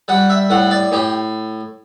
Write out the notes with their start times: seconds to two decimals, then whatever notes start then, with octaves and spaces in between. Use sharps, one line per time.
0.08 G3 F#5
0.30 E5
0.50 A2 F#5
0.71 D5
0.92 A2 G4